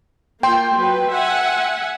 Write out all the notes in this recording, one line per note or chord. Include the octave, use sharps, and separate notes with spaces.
A#3 F4 G5 C6
F#3 B4
E5 F#5 G#5